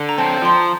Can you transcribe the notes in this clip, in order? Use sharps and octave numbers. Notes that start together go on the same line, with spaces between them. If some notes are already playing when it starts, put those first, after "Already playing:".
Already playing: D3
A#5
C4 A5
F3 C6
A#5